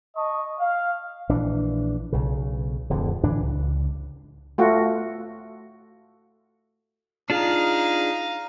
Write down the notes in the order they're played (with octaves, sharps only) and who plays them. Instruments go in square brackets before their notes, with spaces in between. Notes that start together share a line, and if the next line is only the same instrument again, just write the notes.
[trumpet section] D#5 A5 C#6
F5
[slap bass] A#1 E3 D4
B1 C#3
D1 F2 D3
A2 D3 E3 D4
C#2
[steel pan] A3 F4 F#4
[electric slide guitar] D4 F4 G#4 [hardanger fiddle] D#4 F5